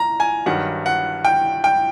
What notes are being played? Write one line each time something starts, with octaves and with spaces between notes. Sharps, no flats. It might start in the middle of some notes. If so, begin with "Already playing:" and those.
Already playing: A#5
G#5
G2 D#3 F#3 F#5
F#5
G5
G5